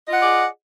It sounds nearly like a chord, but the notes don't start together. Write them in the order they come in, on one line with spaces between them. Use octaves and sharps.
D#5 F4 F#5 G#4 D5